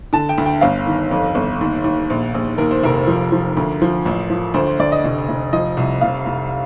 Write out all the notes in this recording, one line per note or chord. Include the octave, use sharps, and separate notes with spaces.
D3 A5
G5
D2
G5
G1 F5
D#3
F2
G1
D#2
D#2
A#1
A#1
D#2 A#4
C5
F1 A#4
F3
F3
D2
F3
A1
F3
D2 C5
C5
D2 D5
D#5
F1
F1
F3 D#5
C2
F1 F5
F1